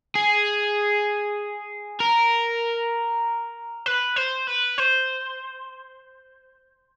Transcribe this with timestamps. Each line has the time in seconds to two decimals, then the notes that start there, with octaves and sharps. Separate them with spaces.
0.15 G#4
2.00 A#4
3.86 B4
4.16 C5
4.47 B4
4.78 C5